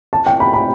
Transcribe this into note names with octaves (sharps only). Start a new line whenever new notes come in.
A5
G5
B5
B5